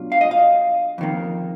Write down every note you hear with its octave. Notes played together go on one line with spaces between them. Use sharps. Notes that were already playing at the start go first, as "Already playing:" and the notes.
Already playing: B2 F#3 D4 F4
F5
D#5
F5
F2 D#3 A#3